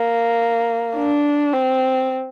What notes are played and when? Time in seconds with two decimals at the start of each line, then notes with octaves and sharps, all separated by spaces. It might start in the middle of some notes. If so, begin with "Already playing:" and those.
Already playing: A#3
0.96 D4
1.53 C4